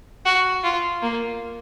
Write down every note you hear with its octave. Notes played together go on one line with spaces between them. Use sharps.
F#4
F4
A#3